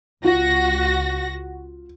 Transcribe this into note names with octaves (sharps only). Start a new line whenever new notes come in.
C#2 F4 F#4 A#6